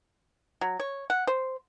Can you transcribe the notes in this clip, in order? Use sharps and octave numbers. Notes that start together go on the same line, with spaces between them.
F#3
C#5
F#5
C5